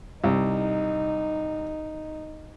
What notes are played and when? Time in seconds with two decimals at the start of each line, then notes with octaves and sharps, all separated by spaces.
0.24 C2 D#4